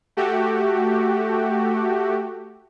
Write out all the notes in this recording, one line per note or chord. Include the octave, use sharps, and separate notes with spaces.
A3 F#4 G4